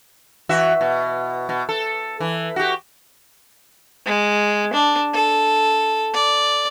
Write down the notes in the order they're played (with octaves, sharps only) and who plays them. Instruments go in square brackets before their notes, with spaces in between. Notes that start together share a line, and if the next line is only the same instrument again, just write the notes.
[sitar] E3 F#4 E5
B2
B2
A4
E3
F#4 G4
[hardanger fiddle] G#3
D4
A4
D5